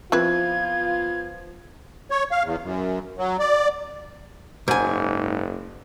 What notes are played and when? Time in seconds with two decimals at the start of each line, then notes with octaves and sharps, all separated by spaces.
0.12 F3 B3 C4 E4 F4 B4 G#6
2.11 C#5
2.31 F5
2.44 E2
2.63 F#2
3.18 F#3
3.39 D5
4.68 F#1 G#2 G#5